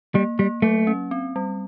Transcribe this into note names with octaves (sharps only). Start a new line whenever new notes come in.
G3 A#3
G3 A#3
F#3 A3
C#4
C4
G3